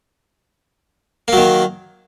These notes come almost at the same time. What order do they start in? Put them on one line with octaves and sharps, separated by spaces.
A#3 F#3 D#3